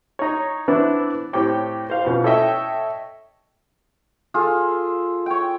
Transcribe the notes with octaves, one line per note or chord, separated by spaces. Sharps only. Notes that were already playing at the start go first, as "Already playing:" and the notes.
D#4 C#5
E3 B3 C4 D4 E4
A2 C4 G4 C#5 G5 D6
C5 F5
F2 B2 C#4
A4 C#5 D#5 E5 G5
F4 G#4 A4
C#5 G5